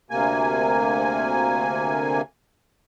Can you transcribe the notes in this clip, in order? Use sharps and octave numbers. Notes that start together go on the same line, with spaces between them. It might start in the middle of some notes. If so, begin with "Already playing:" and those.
D2 C3 A#3 G#5